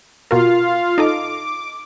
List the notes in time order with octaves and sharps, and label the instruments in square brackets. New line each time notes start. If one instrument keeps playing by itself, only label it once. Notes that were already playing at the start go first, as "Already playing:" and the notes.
[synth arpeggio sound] B2 F#4 A#4 [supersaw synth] F4 F5
[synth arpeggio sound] D#4 A4 D#5 [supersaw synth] D6